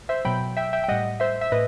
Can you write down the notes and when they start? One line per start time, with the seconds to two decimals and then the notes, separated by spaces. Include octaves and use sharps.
0.09 C5 E5
0.25 B2 F#3 G5 B5
0.57 E5 G5
0.73 E5 G5
0.84 G5
0.88 A2 G3 D#5 F#5
1.20 C5 E5
1.41 E5
1.52 A2 B4 D#5